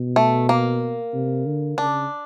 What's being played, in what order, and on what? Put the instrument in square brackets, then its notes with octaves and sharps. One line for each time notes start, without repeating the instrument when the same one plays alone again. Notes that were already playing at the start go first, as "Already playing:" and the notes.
Already playing: [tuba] B2
[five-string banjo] A3
A#3
[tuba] C3
D3
[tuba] C#3 [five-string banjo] D4